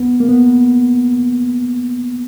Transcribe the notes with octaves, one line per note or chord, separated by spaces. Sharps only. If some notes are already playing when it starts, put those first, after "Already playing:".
Already playing: B3
A#3
B3